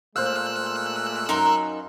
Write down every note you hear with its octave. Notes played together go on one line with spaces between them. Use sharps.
A#2 G#3 A3 C5 F5 E6 F#6
F#2 D#4 A#4 C6